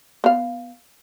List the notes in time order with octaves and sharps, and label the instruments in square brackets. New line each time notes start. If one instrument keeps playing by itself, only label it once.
[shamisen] B3 F5